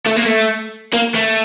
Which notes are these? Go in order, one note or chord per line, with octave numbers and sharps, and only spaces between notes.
A3
A#3
A3
A#3
A3